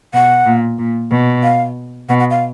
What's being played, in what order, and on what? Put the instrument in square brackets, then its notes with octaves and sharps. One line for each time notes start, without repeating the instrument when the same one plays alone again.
[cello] B2 [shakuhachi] F#5
[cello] A#2
A#2
B2
[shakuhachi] F5
[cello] B2 [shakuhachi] F#5
[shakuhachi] F#5
F5